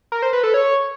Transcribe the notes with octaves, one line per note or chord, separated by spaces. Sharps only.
A#4
C5
B4
A4
C#5